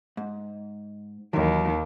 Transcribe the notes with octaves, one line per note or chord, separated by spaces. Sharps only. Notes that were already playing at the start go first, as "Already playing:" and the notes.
G#2
D#2 D#3 E3 F#3